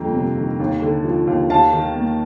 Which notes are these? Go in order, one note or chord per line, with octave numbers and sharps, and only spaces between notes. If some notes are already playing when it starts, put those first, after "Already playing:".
Already playing: G1 F2 A#3 G5 A#5
C3
D#3
D#2
D3
F3
D#2
D#2 F5 A5
D#3
A#3